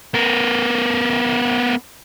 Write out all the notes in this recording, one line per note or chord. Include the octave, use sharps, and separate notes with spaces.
B3 A#4